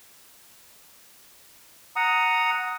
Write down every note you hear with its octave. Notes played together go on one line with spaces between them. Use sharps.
F#5 A#5 D#6